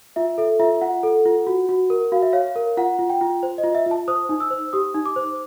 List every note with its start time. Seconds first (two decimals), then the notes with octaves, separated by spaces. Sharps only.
0.16 F4 E5
0.38 A4 E5
0.59 F4 E5
0.81 F4 F#5
1.03 A4
1.25 F4
1.47 F#4
1.69 F#4
1.90 A#4
2.12 F#4 F5
2.22 E5
2.33 C#5 F5
2.56 A#4
2.77 F4 F#5
2.99 F4
3.10 G5
3.21 F4
3.43 C5
3.58 D#5
3.64 F4
3.75 E5
3.86 F4 A5
4.08 C5 D#6
4.29 D#4
4.40 E6
4.50 C5
4.73 G4 D#6
4.94 D#4
5.06 D6
5.16 C5